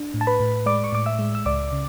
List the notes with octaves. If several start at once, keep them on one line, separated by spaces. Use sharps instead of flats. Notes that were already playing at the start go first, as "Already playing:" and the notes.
Already playing: D4
A2
A5
B4 B5
A2
G#3 D5 D6
C#6
A2 D6
E5 E6
G#3
E6
C#2 D5 D6
C#3